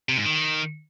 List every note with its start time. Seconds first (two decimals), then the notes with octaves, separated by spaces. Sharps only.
0.09 C3
0.17 G#2
0.26 D#3